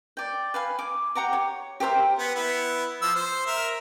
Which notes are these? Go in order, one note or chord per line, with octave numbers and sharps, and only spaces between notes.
D5 G5
B4 F5 G#5
D6
G4 F#5 A#5 D6
C#5
G4 A#4 C5 E5
B3
B3 E4
F3 E6
C5
A#4 E5